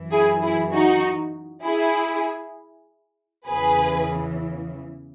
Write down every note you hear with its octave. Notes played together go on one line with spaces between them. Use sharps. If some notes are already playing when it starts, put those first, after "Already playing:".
Already playing: F#2 E3
E4 G#4
E4 G#4
D#4 F#4
E4 G#4
E2 C#3 E3 G#4 B4